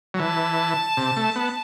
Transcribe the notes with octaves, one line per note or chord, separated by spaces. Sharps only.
F#3
E3 A5
C3
A3
B3